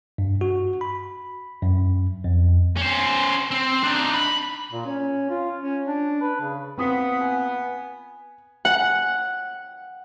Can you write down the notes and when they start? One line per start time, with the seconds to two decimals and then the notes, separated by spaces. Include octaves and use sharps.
0.18 G2
0.41 F#4
0.81 B5
1.62 F#2
2.24 F2
2.77 C#4 C5
3.51 C4
3.83 D4 D#4
4.14 B5
4.73 A#2
4.86 C#4
5.30 F4
5.62 C#4
5.87 D4
6.22 B4
6.41 C#3
6.78 A#2 B3 C4 D#6 B6
7.21 G#5
8.65 F#5